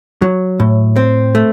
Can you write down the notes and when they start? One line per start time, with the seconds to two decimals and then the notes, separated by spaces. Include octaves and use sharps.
0.22 F#3
0.60 A2
0.96 C4
1.35 A3